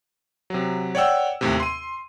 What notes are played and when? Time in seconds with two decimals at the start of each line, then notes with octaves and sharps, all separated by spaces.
0.50 C3 F#3
0.95 C#5 D5 F#5 G5 E6
1.41 D#2 A2 C3
1.60 C6 D#7